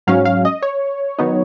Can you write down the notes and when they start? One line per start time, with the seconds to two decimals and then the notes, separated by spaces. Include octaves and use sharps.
0.07 G#2 F#3 C#4 F5
0.25 F5
0.45 D#5
0.62 C#5
1.19 D#3 F#3 B3 D#4